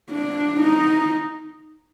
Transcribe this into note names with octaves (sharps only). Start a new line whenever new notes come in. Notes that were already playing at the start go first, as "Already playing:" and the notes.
D4
D#4